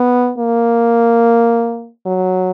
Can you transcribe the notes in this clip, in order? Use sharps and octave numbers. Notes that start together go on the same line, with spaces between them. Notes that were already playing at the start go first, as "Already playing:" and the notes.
Already playing: B3
A#3
F#3